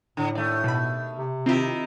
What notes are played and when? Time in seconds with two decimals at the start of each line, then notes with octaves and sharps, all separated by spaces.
0.17 A2 D3
0.35 D#2 A3 D5
0.64 B2 B5
1.17 C3
1.46 D#3 C4 E4 F4 G4